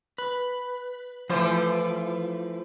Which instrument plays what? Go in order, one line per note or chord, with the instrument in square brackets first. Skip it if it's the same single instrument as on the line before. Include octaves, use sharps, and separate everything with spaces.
[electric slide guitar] B4
[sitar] E3 F4 C5 [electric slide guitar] F3 A3